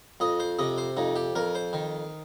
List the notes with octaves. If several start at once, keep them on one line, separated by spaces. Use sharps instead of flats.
F2 D#5
C5
C3 D#5
C5
F2 D#4
G4
F2 A#4
C5
D#3